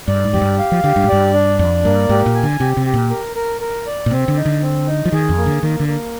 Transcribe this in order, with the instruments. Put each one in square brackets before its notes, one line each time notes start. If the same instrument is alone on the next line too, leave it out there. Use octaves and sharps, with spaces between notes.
[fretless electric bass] G2 [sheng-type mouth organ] D5
[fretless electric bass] G#2
[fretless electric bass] F2 [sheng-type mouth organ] G4
[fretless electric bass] G2
[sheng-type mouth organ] F5
[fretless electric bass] F3
[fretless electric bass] D3 [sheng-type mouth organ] G4
[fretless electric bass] G2
G#2
[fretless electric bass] G2 [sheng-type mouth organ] D5
[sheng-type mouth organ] D4
[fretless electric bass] F2 [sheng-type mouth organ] D5
[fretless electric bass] G2 [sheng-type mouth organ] A#3
[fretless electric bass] G#2 [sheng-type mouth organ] G4
[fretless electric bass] A#2
[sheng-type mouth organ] G#5
[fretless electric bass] D3
[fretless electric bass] C3 [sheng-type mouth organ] G4
[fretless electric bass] C3
[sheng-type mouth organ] G4
[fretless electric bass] A#2
[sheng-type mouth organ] A#4
A#4
A#4
D5
[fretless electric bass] A#2
[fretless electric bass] C3 [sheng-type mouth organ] C4
[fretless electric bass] D3
[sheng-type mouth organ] D#4
[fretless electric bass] D3
[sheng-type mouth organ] C4
D#4
[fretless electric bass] F3
[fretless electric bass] D#3 [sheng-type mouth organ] G#4
[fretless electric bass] F2
[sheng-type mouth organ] A#3
[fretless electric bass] D3
[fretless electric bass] D#3 [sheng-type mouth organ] A#3
[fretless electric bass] D3
[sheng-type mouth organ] A#3